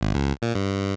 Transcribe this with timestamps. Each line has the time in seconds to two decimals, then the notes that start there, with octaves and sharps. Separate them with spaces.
0.01 G#1
0.15 C#2
0.42 A#2
0.55 G2